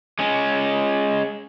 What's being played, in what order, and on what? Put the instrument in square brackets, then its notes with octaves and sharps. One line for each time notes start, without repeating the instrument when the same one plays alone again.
[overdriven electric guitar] G#3 C#4